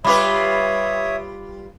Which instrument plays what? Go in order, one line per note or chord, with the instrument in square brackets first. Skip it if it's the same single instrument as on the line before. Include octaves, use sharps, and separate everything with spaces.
[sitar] G3 F4 B4 [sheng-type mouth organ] C#5 E5 D#6 [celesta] B5 D6